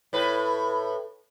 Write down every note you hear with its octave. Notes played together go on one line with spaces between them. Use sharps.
A2 B4